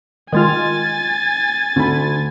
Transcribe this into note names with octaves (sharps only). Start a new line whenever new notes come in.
D#3 G#3 F4 G#5 A6
D2 B5